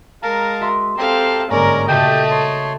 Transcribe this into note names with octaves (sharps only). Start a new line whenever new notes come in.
G#3 A#4 F5 A5 A#5
F#4 E5 C6
C4 G4 A4 E5 F5 A5 A#5 C6
G1 G#2 G#3 A#3 C#4 A#4 D5 A#5
A#2 C#3 A3 F#4 G4 A4 D#5 G5
C#5 C6 A6 D#7